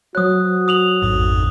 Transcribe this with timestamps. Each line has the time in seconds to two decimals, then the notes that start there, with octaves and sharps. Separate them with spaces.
0.15 F#3 F#4 C5 C#5 D#6 F#6
0.68 D#6 F7 F#7
1.02 A1 F2 G#2